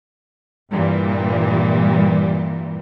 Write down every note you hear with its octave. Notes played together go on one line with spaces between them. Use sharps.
G2 A#2 E3 G3